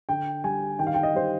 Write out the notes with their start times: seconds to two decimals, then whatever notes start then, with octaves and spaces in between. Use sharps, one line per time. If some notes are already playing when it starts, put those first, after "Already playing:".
0.09 D3 G5
0.44 G3 G#5
0.79 D#3 G5
0.87 F5
0.94 G5
1.03 D#5
1.15 G3 C5